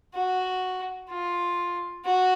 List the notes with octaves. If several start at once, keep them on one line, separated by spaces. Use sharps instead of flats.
F#4
F4
F#4